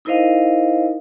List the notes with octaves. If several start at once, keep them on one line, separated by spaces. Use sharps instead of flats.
D#4 E4 A#4 C5 D#5 F5